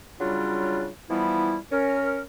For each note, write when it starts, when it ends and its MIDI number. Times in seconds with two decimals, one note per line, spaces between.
0.20 0.88 49
0.20 0.88 54
0.20 0.88 55
0.20 0.88 62
0.20 0.88 65
1.10 1.57 52
1.10 1.57 53
1.10 1.57 55
1.10 1.57 59
1.10 1.57 64
1.71 2.22 61
1.71 2.22 70